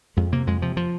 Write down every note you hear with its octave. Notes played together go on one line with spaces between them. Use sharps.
F2 G#3
C3 A#3
F2 G#3
C3 F3
F3